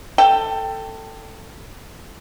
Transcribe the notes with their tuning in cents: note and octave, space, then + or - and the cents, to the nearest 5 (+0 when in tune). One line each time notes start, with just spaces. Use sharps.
A4 +20 G5 +0